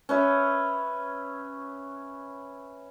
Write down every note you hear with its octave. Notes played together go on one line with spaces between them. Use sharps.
C#4 B4 E5